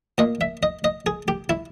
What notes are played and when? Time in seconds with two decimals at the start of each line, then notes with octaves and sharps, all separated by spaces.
0.18 A#2 D#5
0.41 E5
0.63 D#5
0.84 D#5
1.06 G#4
1.28 G4
1.49 E4